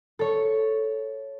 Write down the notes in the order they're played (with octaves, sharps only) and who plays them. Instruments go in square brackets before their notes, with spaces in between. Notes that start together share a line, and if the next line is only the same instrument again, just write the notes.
[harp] A4 C#5